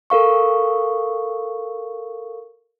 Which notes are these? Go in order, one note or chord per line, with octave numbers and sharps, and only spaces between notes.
A4 A#4 F5 C#6